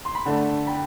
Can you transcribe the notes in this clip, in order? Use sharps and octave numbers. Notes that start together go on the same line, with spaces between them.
C6
B5
D3 A3 D4 F#5 A5
G5 B5